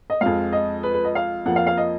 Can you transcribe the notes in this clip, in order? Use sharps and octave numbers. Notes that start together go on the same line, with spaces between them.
D#5
F2 F3 G#3 F5
D#5
B4
B4
D#5
F5
F2 F3 A#3 F#5
F5
F5
D#5